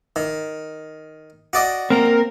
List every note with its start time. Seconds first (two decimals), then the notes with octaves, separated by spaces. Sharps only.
0.16 D#3
1.53 F#4 D5 D#5
1.90 A#3 C4 A#4